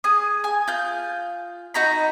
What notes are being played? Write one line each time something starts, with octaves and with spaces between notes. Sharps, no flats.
G#4 D#6
G#5
F4 G6
D#4 F#4 A#5 B5